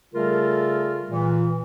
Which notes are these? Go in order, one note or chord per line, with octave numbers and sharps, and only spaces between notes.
C#3 G3 A3 F4 A4 A#4
A#2 E3